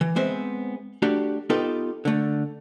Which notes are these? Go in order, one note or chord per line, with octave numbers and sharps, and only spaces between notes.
E3
G#3 B3 C4 C5 E5
A3 D4 F#4 G4
B3 D#4 F4 G4 A4 B4
D3 A3